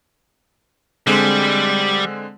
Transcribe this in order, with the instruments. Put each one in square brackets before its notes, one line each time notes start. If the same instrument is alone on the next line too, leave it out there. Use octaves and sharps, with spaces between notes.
[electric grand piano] D3 G#3 C4 [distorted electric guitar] G3